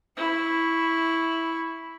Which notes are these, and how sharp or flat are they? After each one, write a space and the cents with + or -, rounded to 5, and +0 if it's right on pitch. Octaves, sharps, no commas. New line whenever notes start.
E4 -5 C#6 +5